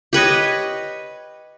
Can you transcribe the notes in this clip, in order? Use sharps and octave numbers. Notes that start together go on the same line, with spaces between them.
G4 B4 C#5 D#5